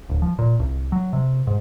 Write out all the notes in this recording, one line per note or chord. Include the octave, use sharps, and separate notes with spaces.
D1
F3
A#2
C2
F#3
C3
G#2